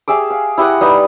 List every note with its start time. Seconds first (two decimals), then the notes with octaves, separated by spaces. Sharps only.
0.08 G4 G#4 E5 D6
0.30 F5
0.58 E4 G4 D#5 F#5
0.81 G3 D#4 B4 D#5